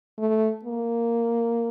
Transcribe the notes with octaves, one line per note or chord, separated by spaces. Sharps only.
A3
A#3